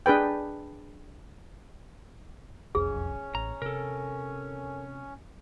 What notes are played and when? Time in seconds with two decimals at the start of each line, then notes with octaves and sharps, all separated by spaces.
0.06 D4 G#4 B4 G5
2.75 E1 B1 F2 C#4 G#4
3.35 A1 A#5
3.62 C3 A4 A#4